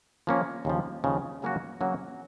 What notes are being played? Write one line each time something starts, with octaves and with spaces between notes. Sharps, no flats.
F3 A#3 C#4 F4
D#2 C#3 F3
D#2 C#3 F3
C#3 F#3 A#3 C#4 F#4
C#3 F#3 A#3 C#4 F#4